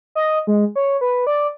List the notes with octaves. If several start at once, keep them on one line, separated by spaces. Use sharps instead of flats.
D#5
G#3
C#5
B4
D5